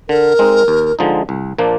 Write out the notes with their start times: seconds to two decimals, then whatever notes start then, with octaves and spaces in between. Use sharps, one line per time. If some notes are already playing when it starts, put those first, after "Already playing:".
0.09 D3 A#4
0.39 G#3 C4 D#4
0.68 D#2
0.99 D3 F3 G#3 D#4
1.29 C2
1.58 A#2 F3 A#3 D4